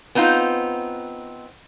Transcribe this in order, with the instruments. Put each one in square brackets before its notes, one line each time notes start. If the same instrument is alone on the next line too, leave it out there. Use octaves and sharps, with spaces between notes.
[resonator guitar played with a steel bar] B3 C4 D#4 F4